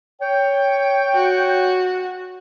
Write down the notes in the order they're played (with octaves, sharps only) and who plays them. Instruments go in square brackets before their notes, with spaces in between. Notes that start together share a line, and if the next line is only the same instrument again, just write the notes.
[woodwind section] C#5 G5
[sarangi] F#4